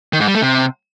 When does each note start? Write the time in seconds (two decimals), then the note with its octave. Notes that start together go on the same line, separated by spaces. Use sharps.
0.13 D#3
0.20 G#2
0.27 G3
0.35 A3
0.42 C3